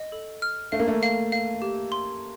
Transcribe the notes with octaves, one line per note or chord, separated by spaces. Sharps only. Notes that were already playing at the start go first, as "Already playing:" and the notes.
Already playing: D#5
A4
F6
A3 F5
A#3
A3
F5
F5
G4
C6